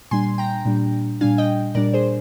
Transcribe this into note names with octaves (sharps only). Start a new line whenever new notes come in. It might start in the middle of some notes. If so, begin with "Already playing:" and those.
A#2 G3 D4 G#5 C6
G5 A#5
A#2 G3 D4
A#2 G3 D4 F5 G#5
D#5 G5
A#2 G3 D4 A#4 D5
G#4 C5